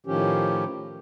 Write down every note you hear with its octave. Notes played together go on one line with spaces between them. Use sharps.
A2 D#3 F3 C#4 G4